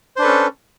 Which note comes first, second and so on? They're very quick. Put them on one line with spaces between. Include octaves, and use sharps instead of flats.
C5 D4 B4 A4 C#4